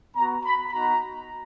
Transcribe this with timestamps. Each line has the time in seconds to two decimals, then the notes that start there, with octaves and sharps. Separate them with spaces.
0.16 B3 F#4 A#5
0.45 B5
0.72 B3 D#4 F#4 A#5